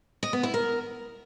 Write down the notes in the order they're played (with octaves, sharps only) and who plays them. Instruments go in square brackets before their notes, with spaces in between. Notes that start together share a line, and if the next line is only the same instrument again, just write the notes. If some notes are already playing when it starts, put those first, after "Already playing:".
[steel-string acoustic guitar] D#5
B3
E4
A#4